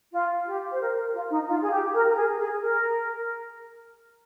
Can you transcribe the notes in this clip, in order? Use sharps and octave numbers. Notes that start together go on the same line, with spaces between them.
F4
G4
C5
A#4
A#4
F4
D#4
F4
G#4
G4
A#4
A#4
G#4
G#4
A#4